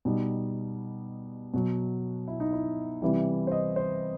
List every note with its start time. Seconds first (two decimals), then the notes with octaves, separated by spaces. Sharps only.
0.05 B2 G3 D#4
1.54 B2 F#3
2.28 E4
2.40 D#4
2.53 E4
3.02 C3 E3 G3 E4
3.47 C5
3.52 D#5
3.76 C5